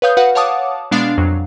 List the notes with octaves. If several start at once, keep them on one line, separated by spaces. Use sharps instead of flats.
B4 C#5 F5 D#6 G6
F#4 B4 F5 F#5
C#5 F5 F#5 A5 D6 D#6
B2 G#3 B3 D4 F5 C7
F2 F#3